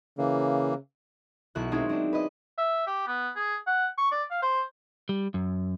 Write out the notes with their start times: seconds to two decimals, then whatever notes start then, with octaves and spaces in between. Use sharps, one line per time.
0.18 C#3 E3 A#3
1.55 B1 E4 F#4 F#6
1.71 G#3 C4 C#4 D#4 E4 G#4
1.89 C4 D4
2.13 B4 D#5
2.59 E5
2.87 G4
3.07 B3
3.36 G#4
3.67 F#5
3.98 C#6
4.12 D5
4.31 F5
4.42 C5
5.09 G3
5.34 F#2